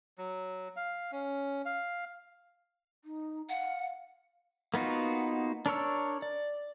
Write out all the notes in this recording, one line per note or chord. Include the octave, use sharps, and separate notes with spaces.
F#3
F5
C#4
F5
D#4
F5 F#5
A#3 B3 D#4 F4 F#4
D4 A#4 C#5 E6
D5